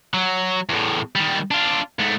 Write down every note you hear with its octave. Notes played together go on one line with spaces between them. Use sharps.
F#3
E2 A2
D#3 G3
D4 F4
G#2 A3